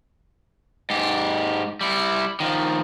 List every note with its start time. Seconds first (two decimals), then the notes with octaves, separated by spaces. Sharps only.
0.90 G#2 G4
1.81 G3 E4
2.40 D#3 F3